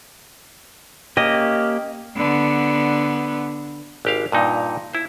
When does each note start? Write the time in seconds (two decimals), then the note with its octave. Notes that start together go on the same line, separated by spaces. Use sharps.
1.17 A#3 C#4 G4 D#5
2.17 D3 B3
4.05 G#1 G4 F5
4.32 G2 A#2 D#4 F#5
4.93 E4 C5